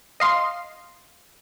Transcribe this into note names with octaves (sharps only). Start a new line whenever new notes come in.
D#5 F5 C6